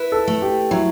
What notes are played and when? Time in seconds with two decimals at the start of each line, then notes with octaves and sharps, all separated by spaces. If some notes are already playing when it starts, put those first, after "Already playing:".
Already playing: E4 B4
0.12 A4
0.28 A3
0.42 G4
0.71 F#3 E4